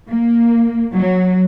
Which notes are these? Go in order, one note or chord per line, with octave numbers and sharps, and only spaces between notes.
A#3
F#3